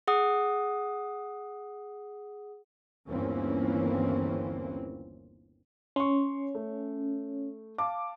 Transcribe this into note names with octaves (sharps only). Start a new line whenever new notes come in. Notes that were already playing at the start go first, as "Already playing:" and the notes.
G#4 F#5 D#6
G1 D#2 E3 A#3 C4 C#4
C#4 C6 C#6
A3
F5 A5 D6